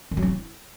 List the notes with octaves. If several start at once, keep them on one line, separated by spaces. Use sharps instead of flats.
D#3
F#3
D4
E4